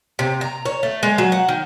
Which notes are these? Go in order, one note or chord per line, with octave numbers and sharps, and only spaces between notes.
C3
A#5
C#5
A3
G#3
F#3
F#5
D#3